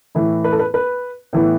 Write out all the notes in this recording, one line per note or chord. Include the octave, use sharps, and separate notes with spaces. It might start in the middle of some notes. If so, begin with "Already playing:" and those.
A2 E3 A3 E4
B4
A4
B4
B4
A2 E3 B3